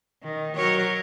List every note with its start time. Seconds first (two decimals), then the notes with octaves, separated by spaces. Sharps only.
0.23 D#3
0.56 F#3 A#4 C#5